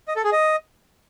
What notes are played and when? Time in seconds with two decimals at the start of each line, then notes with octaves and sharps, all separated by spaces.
0.08 D#5
0.16 A4
0.24 G#4
0.32 D#5